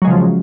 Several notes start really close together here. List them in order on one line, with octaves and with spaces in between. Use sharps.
F#3 G#3 C#3 F3